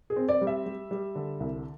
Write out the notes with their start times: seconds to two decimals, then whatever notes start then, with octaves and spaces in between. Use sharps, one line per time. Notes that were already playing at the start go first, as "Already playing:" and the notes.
0.10 G#4
0.16 C4
0.29 D5
0.41 G3
0.47 E5
0.66 G3
0.91 G3
1.15 D3
1.40 C2